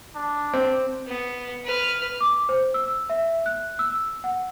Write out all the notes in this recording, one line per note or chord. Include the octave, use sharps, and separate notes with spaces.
D4
C4
B3
B4 F6
D6
C5
E6
E5
F#6
E6
F#5